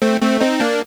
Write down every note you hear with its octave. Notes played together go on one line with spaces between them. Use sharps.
A3 C4
A3 C4
C4 D#4
A#3 D4